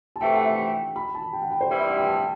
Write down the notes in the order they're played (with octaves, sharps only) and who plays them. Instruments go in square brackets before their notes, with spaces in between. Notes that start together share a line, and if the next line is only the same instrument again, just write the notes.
[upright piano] A5
[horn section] C3 E3 A3 [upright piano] G5
[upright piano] F#5
E5
G5
B5
A5
G5
F#5
G5
C5
[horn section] G2 E3 G3 C4 E4 [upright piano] D5
[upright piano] E5
F#5
G5
A5